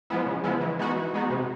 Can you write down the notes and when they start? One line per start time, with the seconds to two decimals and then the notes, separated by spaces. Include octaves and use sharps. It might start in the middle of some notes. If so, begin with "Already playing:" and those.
0.10 F3 G#3 B3 E4
0.26 C#3
0.44 F3 G#3 B3 E4
0.61 E3
0.79 G#3 B3 D#4 F#4
0.96 E3
1.14 G#3 B3 D#4 F#4
1.30 C3